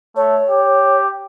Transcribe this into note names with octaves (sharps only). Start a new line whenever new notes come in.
A3 C#5
G4